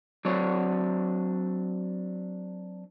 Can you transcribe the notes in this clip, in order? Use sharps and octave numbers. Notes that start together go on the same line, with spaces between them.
F#3 C4 D4 C#5